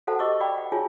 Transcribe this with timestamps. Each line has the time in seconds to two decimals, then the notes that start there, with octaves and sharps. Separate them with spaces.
0.07 F#4 A4 C5 F5 F#5 A5
0.19 G4 D#5 C#6 D6 E6
0.40 D5 F5 G5 B5 D6
0.57 F#5
0.72 F4 F#4 G#4 C#5 G#5 A5